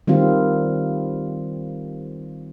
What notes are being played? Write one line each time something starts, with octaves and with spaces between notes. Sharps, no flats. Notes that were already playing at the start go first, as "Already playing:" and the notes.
D#3 G3 C4 F4